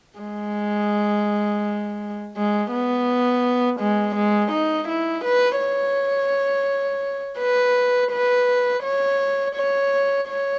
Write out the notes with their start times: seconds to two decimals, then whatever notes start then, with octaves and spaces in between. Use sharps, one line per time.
0.20 G#3
2.37 G#3
2.73 B3
3.80 G#3
4.16 G#3
4.52 D#4
4.89 E4
5.25 B4
5.60 C#5
7.39 B4
8.12 B4
8.84 C#5
9.56 C#5
10.28 C#5